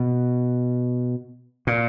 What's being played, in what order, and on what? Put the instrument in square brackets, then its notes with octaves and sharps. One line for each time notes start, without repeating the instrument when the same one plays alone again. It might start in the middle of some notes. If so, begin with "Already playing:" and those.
Already playing: [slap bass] B2
A#2